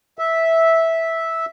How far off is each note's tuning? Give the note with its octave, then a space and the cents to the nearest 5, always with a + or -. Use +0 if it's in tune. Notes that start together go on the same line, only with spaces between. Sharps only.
E5 -10